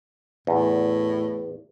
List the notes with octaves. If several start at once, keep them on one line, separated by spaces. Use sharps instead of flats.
E2 A2